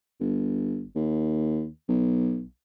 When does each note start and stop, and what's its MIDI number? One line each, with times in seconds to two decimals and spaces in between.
0.20 0.84 31
0.96 1.67 39
1.89 2.42 35